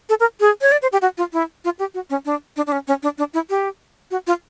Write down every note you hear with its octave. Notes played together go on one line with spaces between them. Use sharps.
A4
A#4
G#4
C#5
D5
C5
G4
F#4
F4
E4
F4
G4
F#4
C#4
D4
D4
D4
C#4
C#4
D4
D4
E4
G4
F#4
F4